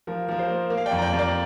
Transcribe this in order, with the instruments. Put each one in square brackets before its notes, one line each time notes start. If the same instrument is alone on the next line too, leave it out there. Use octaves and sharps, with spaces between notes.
[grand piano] F3 A#4
F3 A#4
C5
A#3
A#3
F5
D5 G5
F2
A#5
D5 G5
F2
A#4 D5